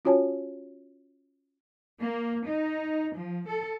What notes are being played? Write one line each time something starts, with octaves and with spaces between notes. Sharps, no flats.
C#4 F4 F#4 C#5 G#5 A5
A#3
D#4
F3
A4